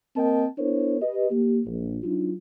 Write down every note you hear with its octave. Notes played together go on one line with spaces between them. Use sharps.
A#3 C4 A#4 D#5 G5 A5
B3 D4 E4 A#4 C5 C#5
G4 B4 D#5
A#3 G4
A#1
F#3 D4 D#4 F4